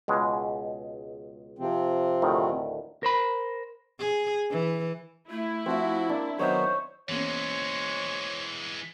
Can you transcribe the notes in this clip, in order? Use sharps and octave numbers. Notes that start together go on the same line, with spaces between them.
C#2 B2 G#3
C3 F3 C4
D2 A2 D#3
A#4 C5 B5
G#4
E3
A3 E4
F3 C4 F#4 E5
A#3 D4
D#3 F#3 B3 C5 C#5 D#5 E5
E2 E3 G#3 A#3 C#4 C5 C#5